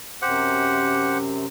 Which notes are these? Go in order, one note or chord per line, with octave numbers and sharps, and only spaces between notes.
F#2 C3 G4 C5 F#5